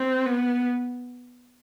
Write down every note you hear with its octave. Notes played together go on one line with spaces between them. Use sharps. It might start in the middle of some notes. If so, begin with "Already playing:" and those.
Already playing: C4
B3